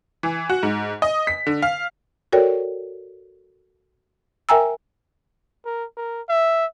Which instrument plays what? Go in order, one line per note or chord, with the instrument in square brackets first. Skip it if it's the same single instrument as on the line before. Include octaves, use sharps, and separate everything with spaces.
[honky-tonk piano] E3
F#4
G#2
D#5
B6
D3
F5
[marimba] F#4 A4 A#4 C#5 D5 G5
A#4 E5 G5 G#5 A#5 E6
[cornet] A#4
A#4
E5